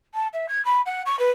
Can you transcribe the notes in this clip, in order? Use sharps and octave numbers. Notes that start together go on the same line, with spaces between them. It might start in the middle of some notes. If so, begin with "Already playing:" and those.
A5
E5
G#6
B5
F#5
C#6
B4